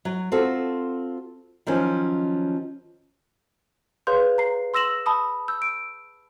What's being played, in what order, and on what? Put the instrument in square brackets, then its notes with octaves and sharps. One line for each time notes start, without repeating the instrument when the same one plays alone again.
[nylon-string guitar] F#3
C4 F4 F#4 A4
D#3 F3 F#3 C#4
[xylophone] G#4 B4 C#5 F5 C6 G6
A#5 C7
C6 E6 A#6 E7 F#7
A5 B5 D#6
E6 G6
D7